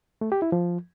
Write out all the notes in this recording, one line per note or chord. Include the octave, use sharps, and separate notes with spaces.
A3
G4
E4
F3